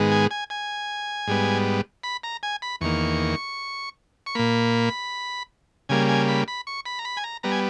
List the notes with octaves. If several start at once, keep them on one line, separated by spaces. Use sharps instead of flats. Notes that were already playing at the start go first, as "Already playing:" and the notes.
Already playing: G#2 D#3 G#3 B3
G#5
G#5
G#5
G#2 G3 B3
B5
A#5
G#5
B5
E2 D#3 A#3 C#6
C#6
A#2 A#3 B5
C#3 G3 A#3 G#5
G#5
B5
B5
C#6
B5
A#5
B5
G#5
A#5
G3 B3 A#5
G#5